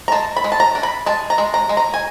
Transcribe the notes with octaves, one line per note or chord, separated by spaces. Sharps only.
A#5
G#3 A5
B5
G#3
A5
A#5
D4
B5
G#3 A5
A#5
G#3
A#5
G#3
A#5
G#5